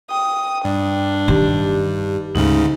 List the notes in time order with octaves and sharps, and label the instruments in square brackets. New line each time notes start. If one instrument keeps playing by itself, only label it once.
[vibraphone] G5 [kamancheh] D#6
[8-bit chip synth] G2 [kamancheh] D4
[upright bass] D#3 [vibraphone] G4
[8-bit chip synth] D2 G#2 C#3 [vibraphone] D#4